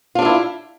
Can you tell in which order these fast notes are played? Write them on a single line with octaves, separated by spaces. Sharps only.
F4 D4 A4 E4